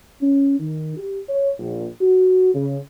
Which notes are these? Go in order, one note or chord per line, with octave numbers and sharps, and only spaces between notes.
C#4
D#3
G4
C#5
A#1
F#4
C#3